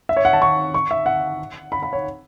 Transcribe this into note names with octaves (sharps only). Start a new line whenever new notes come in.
E5
C#5
F#5
A5
C#6
C#6
E5
F#5
B5
B5
C#5